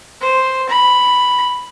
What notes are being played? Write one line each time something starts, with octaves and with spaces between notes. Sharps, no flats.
C5
B5